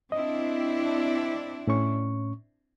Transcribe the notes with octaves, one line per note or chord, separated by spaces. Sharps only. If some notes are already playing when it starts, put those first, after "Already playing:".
C4 D4 E4 D#5
A2 C#4 C#6